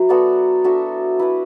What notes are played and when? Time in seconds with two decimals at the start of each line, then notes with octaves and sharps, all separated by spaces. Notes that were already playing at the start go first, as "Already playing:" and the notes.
Already playing: F#3 E4 B4
0.09 B3 F#4 A4 D5
0.64 D4 F#4 A4 E5
1.19 E4 B4 E5